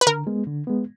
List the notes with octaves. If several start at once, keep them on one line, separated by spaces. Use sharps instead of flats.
B4
D3 A#4
G#3 B3
D3
G#3 B3